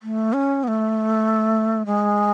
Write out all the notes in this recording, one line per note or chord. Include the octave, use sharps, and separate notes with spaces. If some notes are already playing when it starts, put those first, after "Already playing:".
A3
C#4
B3
A3
G#3